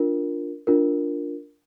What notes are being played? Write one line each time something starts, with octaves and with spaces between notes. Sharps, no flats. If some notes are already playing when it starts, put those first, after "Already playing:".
Already playing: D4 F4 A#4
D4 F4 A#4